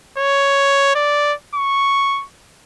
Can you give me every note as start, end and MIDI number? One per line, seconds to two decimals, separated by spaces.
0.18 0.92 73
0.95 1.34 74
1.55 2.25 85